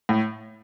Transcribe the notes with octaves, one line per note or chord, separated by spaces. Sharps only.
A2